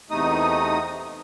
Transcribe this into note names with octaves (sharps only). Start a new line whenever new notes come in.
E2 C3 A3 D#4 D#6